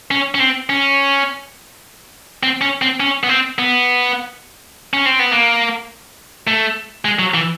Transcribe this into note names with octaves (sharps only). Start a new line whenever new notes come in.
C#4
C#4
C4
C#4
C4
C#4
C4
C#4
B3
C4
B3
C#4
C4
B3
A#3
A3
G#3
F#3
E3